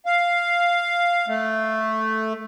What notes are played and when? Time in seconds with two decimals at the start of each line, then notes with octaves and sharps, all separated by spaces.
0.06 F5
1.28 A3